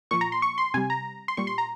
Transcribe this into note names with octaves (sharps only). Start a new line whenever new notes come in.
A#2 F3 C#6
A#5
C6
C#6
C6
C3 G3 G#5
A#5
C6
A#2 G3 C#6
C6
A#5